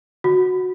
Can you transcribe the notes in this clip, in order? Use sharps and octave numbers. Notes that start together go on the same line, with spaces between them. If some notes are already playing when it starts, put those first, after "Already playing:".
F#4